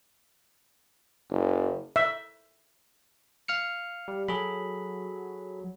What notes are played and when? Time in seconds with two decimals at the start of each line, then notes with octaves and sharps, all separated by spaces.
1.30 F#1
1.96 E5
3.48 F5 F6 C#7
4.08 G3
4.28 F#3 G#4 A4 B5